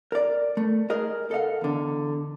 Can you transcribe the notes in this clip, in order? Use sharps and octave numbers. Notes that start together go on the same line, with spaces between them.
A#4 D5
A3
G#4 A#4 D#5
A4 D#5 F5 F#5
E2 D3